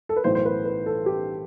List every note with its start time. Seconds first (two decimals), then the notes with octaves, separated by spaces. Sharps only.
0.09 A4
0.16 B4
0.24 B1 A2 E3 C5
0.35 C5
0.45 B4
0.65 B4
0.86 A4
1.06 G4